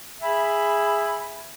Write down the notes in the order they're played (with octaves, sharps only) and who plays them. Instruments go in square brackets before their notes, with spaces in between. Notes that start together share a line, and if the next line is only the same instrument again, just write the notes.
[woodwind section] G#4 E5 G#5 B5